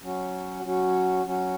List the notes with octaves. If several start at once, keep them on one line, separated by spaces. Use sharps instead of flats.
F#3 C#4 F#4
F#3 C#4 F#4
F#3 C#4 F#4